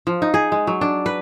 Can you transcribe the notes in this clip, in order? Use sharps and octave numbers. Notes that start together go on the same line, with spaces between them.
F3
D#4
G#4
G#3
F#3
D4
B4